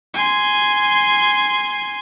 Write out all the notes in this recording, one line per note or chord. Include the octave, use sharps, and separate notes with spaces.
G#5 C6